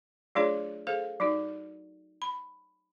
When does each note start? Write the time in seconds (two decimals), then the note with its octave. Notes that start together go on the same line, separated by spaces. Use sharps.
0.35 F#3 A3 D4 F4 G#4 C#5
0.87 G#4 A4 C5 F5
1.20 F#3 D#4 F#4
2.22 B5